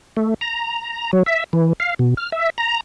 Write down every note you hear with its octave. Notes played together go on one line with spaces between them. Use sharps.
A3
A#5
F#3
E5
E3
F5
B2
F6
E5
A#5